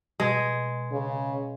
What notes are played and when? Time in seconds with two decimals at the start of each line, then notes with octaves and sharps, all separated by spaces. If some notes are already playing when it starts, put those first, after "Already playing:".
0.20 B2 G#3
0.91 C#3